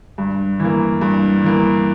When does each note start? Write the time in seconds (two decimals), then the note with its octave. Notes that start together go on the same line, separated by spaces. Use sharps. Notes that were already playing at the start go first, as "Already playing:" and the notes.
0.18 G2
0.60 E3 A#3
1.01 G2
1.44 E3 A#3